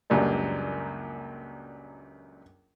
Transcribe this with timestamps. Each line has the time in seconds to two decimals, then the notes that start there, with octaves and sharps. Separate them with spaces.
0.10 C#2 F#2 A#2 G3 D4